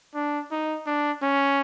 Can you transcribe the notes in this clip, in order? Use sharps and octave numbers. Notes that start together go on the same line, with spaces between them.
D4
D#4
D4
C#4